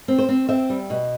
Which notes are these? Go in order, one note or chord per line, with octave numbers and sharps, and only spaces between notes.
C4
C5
C4
C4 E5
G3
B2